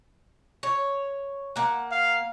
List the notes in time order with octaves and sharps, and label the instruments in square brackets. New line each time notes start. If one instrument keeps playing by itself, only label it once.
[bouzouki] C#5
A#3 F#5
[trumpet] F5